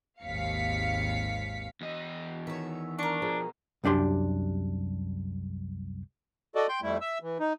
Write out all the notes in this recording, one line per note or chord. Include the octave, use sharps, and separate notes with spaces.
G#1 D#2 F5 B6 C#7
E2 D#5
D#3 C#5 E5
D4 A#4 C#6
B2 F3 G#4
C2 F#2 D4 G4 C6
F#4 A4 D5 D#5
G5 C6 G6
F2 G3 A3 E4
E5 E6
E3
D#4